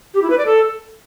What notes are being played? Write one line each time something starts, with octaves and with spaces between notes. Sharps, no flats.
G4
E4
B4
D5
A4